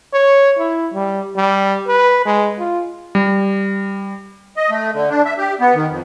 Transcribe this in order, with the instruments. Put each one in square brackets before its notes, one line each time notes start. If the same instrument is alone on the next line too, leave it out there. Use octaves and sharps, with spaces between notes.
[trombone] C#5
E4
G3
G3
B4
G#3
F4
[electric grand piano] G3
[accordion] D#5
A3
D3
D4
E5
G4
B3
D#3
F2